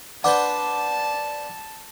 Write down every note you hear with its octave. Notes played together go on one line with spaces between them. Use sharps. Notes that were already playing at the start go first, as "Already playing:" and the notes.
D4 B4 C5 F#5 A5 D6